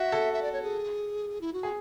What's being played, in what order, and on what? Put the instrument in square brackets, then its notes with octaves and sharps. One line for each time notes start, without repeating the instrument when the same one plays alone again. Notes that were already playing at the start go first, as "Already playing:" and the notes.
Already playing: [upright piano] F#4 [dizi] E5
[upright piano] A4
[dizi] E5
D5
C#5
G#4
E4
F#4
[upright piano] G#4